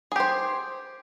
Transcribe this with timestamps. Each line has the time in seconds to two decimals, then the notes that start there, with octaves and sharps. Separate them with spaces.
0.12 G#4
0.16 G4
0.20 C5